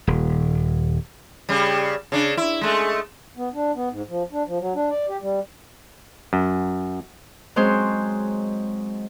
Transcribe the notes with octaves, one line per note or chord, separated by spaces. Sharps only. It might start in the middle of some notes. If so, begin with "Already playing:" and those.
D#1
C#3 G3
C#3 D4
E4
G#3 A3
B3
D4
B3
G#2
F3
D4
F3
F#3
D4
D5
G4
G3
F#2
F#3 G#3 C4 C#4 G#4 C5